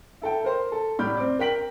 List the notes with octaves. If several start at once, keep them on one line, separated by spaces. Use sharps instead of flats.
E4 A4 G5
A#4 C5
A4
C2 A2 D5 B5 F6 G6
C4 D5
A#4 G5 B6 F#7